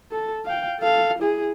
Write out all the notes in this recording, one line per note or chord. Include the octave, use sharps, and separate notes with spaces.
A4
F5 G5
A4 F5
E4 G#4